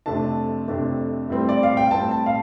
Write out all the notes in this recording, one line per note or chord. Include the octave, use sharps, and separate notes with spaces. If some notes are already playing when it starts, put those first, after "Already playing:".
F2 C3 A3 D4 A5
F2 C3 A3 D4
A2 G3 C4
D5
F5
G5
A2 G3 C4 A5
A5
F5